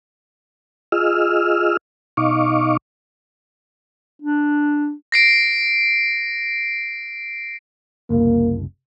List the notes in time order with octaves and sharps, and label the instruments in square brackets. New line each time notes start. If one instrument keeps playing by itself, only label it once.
[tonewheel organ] F4 G#4 D#5 E6 F6
B2 D#4 D#5 F5 C#6 D6
[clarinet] D4
[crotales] A#6 C7 D7
[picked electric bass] F#1 C2 [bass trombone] A#3